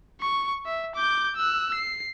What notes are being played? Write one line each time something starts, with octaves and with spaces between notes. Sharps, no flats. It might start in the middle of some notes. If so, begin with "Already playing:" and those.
C#6
E5
D6 G6
E6 F#6
C7